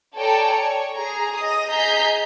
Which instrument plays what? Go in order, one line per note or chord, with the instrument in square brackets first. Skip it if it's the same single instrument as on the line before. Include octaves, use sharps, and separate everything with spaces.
[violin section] A4 C#5 D5 G5 G#5 A#5
C#5
G#4 A#5
D#5 D#6 A#6
G#4 D#5 A#5 G6 B6 C7